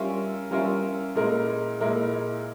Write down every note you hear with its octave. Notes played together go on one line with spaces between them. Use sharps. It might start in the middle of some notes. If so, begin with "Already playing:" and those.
Already playing: G3 C#4 F4 A#4 E5
G3 C#4 F4 A#4 E5
A#2 G#3 E4 A#4
A#2 G#3 E4 A#4